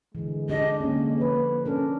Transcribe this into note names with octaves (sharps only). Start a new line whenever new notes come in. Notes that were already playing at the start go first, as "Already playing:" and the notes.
D3 E3 G#3
D4 D#4 G4 D#5
D3 A#3 C#4
F3 B4 C#5
C#4 D4 A4 A#4